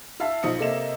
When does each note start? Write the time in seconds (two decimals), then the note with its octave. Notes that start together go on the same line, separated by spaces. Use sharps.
0.20 E4 E5 F5 A5 E6
0.43 B1 F3 D#4 D#6 C#7
0.59 C3 A#3 A4 D#5 E5 E7